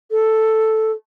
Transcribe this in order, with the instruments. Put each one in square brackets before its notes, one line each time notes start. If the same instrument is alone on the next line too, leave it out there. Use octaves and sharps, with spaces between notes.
[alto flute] A4